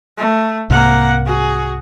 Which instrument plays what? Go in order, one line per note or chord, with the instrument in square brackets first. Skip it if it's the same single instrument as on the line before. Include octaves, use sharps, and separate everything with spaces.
[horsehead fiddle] A3
[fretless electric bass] C2 G#2 C3 [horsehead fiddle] A#3 F#5
[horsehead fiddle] F#4 G#4